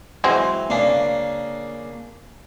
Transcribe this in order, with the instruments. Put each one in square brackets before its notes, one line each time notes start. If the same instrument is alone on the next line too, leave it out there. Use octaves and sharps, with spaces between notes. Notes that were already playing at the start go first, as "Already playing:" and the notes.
[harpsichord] E3 [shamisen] F#3 G#3 C4
[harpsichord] C#3 A#3 D4